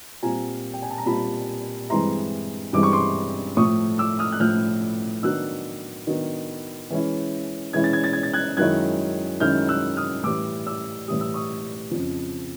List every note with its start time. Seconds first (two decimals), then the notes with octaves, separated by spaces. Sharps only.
0.23 A#2 G3 C4 F4 G#5 A#5
0.73 G5
0.82 G#5
0.91 A5
0.98 A#5
1.06 A#2 G3 C4 F4 A5 B5
1.90 G2 E3 G#3 C4 E4 A#5 C6
2.73 G2 E3 G#3 C4 E4 D6
2.83 C#6
2.92 C6 D6
3.57 A2 F3 A3 C#6 D#6
3.98 D6 E6
4.19 D#6 F6
4.32 F#6
4.40 A2 F3 A3 F6 G6
5.23 D#3 F#3 B3 D4 E6 F#6
6.07 D#3 F#3 B3 D4
6.90 E3 G#3 C#4 E4
7.73 E3 G#3 C#4 E4 G#6
7.84 A6
7.93 G#6
8.04 A6
8.13 G#6
8.23 A6
8.33 F#6 G#6
8.57 F#2 D#3 G#3 C#4 E4 F#6 G#6
9.40 F#2 D#3 G#3 C#4 E4 F6 G6
9.69 E6 F#6
9.97 D#6 F6
10.24 A2 E3 G3 D6 E6
10.66 D6 E6
11.08 A2 E3 G3 D#6
11.21 E6
11.34 C#6 D#6
11.91 F2 C#3 F3